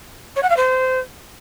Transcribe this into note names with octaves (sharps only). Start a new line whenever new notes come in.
C#5
F#5
F5
C5